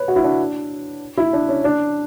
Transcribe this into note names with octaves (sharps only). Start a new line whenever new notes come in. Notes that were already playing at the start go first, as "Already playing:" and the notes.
Already playing: B4 C#5
F#4
E4
D4
E4
D4
C#4
D4